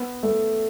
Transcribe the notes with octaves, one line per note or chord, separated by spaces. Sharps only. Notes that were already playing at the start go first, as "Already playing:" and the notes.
Already playing: B3
A3